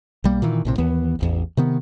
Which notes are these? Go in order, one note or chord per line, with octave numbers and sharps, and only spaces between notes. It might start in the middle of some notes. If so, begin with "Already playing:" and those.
B1 G3 A#3
A#2 D#3 E3
A#1 A2 C3
D#2 E3 B3
D1 A1 E2
C3 D#3 B3